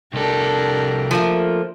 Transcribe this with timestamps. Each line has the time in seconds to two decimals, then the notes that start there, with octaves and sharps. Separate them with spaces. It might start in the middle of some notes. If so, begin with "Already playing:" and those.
0.14 C2 D4 G4 A4 A#4
1.11 F3 A3 A#3